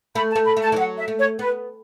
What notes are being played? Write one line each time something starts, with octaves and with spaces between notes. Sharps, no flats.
A3 B5
A5
A3
B5
A3
A5
E3
F#3 F#5
E5
A3
C#5
B3 B4